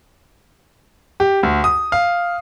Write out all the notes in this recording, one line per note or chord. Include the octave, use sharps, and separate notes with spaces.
G4
D2
D#6
F5